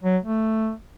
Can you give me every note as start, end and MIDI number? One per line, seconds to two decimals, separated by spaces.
0.03 0.18 54
0.24 0.72 57